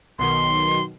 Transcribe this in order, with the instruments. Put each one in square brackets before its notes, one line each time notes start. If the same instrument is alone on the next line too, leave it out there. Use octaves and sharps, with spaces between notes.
[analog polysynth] B1 B2 D#3 [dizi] C6